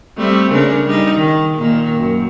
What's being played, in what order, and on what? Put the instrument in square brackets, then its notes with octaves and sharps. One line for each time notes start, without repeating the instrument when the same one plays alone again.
[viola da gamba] G3 A3 C4
C#3 D4 A#4
G3 D#4
D#3
A#2 D#3 A#3
F#2